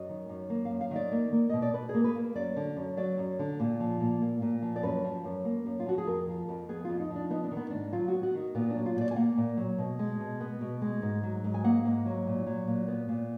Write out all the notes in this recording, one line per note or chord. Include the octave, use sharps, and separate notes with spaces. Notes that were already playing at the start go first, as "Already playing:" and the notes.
Already playing: F#2 D#5
D#3
F#2
A#3
F5
F#2
F5
D#3 D5
A#3
A#3
B2 D#5
D5
B2 B4
G#4
A#3
B4
A#3
F#2 D5
D3
F#2
F#3 D5
F#2
D3
A#2
F3
A#2
A#3
A#2
F3
D5
F#2 B4
F3
F#2
A#3
F#2
F4
F3 F#4
G#4
F2 A#4
F3
F2
B3 G#4
F2 F4
D#4
F3
D4
B3 D#4
D4
D#3
B3
G#2 D4
F#3 F4
F#4
B3
F#4
D#3
A#2 B3
D4
F#3
F4
A#2 D5
G#5
A#3 F#5
A#2
F#3
B2
G#3
B2
B3
B2
G#3
G#2
F#3
G#2
G#5
A#3 F#5
G#2
F#3
A#2
F#3
A#2
B3
A#2